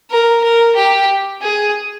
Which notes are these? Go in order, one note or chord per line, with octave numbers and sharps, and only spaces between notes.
A#4
A#4
G4
G#4